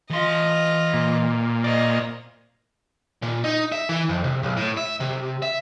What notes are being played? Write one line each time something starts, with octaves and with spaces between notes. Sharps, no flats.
E3 F4 D#5 C6
A#2
C5 D5 D#5
A#2
D#4
E5
E3
F2
C3
B1
A2
E5
C3
E5